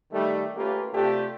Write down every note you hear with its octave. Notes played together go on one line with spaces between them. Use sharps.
D#3 G3 A3
A3 A#3 C#4 F4 G4 B4
C3 A3 D4 F4 G4